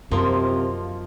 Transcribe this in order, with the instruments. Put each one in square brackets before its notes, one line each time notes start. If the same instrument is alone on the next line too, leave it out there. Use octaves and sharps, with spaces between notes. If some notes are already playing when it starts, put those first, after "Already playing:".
[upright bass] F#2 [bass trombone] C3 [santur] F3 [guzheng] A#3 D#4 F4